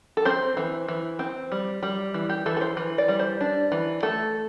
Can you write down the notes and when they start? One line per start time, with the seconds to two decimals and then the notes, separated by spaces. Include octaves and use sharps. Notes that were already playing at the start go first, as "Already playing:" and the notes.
0.17 A4
0.25 C4 C5
0.57 E3
0.88 E3
1.19 C4
1.52 G3
1.83 G3
2.14 E3
2.29 G4
2.46 E3 A4
2.57 A4
2.61 C5
2.77 E3
2.98 D5
3.08 G3
3.19 C5
3.41 D4
3.72 E3
4.03 A3 A4